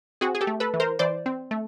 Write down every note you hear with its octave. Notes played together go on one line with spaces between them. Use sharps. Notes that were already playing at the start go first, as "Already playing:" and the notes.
C4 F#4 G#4
G#4
G4 A4
A3
A4 B4
E3
A#4 C5
E3 C5 D5
C4
A3